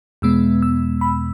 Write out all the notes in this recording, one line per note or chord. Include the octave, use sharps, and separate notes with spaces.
E2 B2 G#3 B3 E6
E6
B5